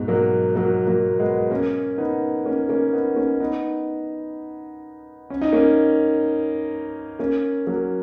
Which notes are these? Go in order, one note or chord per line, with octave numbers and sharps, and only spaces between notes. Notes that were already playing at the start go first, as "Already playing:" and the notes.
Already playing: G#2 B2
F#3 A#3
F#3 A#3
F#3 A#3
G#3 B3
A#3 C#4
B3 D#4
A#3 C#4
A#3 C#4
B3 D#4
A#3 C#4
B3 D#4
C#4
D#4
A#3 C#4
A#3 C#4
F#3 A#3